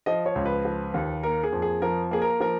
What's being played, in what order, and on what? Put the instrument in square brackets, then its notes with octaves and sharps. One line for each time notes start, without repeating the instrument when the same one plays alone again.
[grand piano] F3 D#5
C#5
C#2
B4
F3
D#2
A#3 A#4
G#4
F2
G#4
F3 A#4
A#3 G#4
A#4
F3 A#4